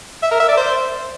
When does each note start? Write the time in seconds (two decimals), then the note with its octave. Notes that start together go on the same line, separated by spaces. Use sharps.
0.23 E5
0.31 A#4
0.40 E5
0.48 D5
0.57 C5